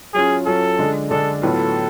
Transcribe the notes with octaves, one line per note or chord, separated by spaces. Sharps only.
F#3 C#4 F4 G#4
F#3 C#4 F4 A4
D3 G#3 D4
D3 G#3 D4 A4
A2 F#3 B3 F4 A4